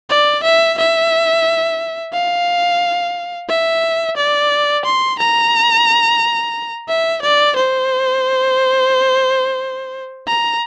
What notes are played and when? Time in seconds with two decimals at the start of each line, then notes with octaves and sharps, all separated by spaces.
0.10 D5
0.43 E5
0.78 E5
2.14 F5
3.49 E5
4.17 D5
4.85 C6
5.19 A#5
6.88 E5
7.22 D5
7.56 C5
10.28 A#5